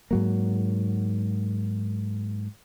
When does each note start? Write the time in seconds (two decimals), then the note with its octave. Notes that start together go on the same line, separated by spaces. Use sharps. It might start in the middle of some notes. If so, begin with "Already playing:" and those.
0.11 G#2 F#3 A#3